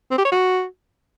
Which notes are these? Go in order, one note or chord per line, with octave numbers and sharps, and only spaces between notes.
C4
G4
C#5
F#4